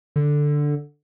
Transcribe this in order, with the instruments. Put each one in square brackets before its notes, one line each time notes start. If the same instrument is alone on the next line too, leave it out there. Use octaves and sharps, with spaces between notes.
[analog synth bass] D3